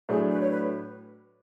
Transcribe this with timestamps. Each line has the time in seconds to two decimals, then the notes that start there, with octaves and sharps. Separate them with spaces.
0.09 A2 F#3 A3 D4 G#4
0.29 B4
0.40 C#5
0.50 B4